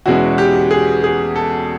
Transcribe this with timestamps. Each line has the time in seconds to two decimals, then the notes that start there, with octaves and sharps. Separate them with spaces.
0.06 E2 B2 G#3 C#4 E4 F#4
0.38 G4
0.71 G#4
1.04 G#4
1.36 A4